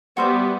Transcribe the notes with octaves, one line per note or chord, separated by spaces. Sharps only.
G3 B3 F#4 C5 E5